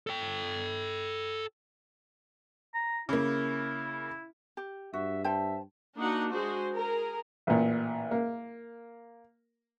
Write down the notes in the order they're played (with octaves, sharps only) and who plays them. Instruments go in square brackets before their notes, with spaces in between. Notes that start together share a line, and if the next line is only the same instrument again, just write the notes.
[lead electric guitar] A4 G5
[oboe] A#5
[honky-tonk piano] C#3 A#3 [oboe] E4
[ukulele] G4
[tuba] G2 [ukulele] F#4 [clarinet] E5
[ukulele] C5 G5 A5 [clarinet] E5
[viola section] A#3 D4 D#4 F#4 F#5
G#3 F#4 G#4 C5
G#4 A#4
[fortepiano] A1 A#2
A#3